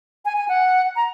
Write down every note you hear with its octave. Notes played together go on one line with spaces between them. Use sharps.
G#5
G#5
F#5
A#5